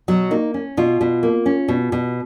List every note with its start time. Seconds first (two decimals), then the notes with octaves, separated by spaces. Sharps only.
0.08 B2 F#3 F#4
0.31 A#3 D#4
0.54 C#4
0.77 B2 F4
1.01 B2
1.23 A#3
1.46 C#4
1.68 B2
1.92 B2